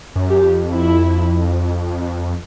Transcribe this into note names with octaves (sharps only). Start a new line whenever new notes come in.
F#2
G4
F2
E4